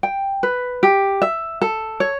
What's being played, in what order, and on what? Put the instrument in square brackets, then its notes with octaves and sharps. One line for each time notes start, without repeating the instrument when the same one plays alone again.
[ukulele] G5
B4
G4
E5
A4
C#5